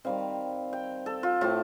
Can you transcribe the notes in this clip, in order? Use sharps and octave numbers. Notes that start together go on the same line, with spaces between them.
D#3 G3 C4 F5
G5
A4
F4
A2 A3 C4 F4